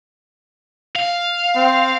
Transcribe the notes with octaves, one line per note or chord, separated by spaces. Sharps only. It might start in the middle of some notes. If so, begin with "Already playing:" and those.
F5
C4